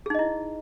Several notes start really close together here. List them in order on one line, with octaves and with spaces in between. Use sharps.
G#4 D#4 D#5 E4